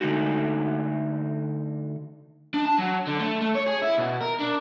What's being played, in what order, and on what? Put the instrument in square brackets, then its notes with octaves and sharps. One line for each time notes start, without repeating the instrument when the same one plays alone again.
[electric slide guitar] D3 A3 D#4 F#4
[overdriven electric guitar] D4
A5
F#3
D3
A3
A3
C#5
G#4
E4
B2
A#4
D4